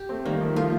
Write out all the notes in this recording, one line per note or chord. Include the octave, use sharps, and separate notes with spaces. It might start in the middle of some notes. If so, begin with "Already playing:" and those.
Already playing: G4
A3 C4
D#3 G3 A#3
F3 A3
F3 A3 F4